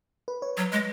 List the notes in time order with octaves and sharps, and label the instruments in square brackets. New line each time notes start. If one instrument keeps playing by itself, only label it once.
[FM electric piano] B4
C#5
[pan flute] F#3
G#3